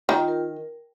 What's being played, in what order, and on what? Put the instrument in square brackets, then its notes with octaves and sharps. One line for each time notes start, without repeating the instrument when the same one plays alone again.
[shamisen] D#3 [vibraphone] F4
[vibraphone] A#4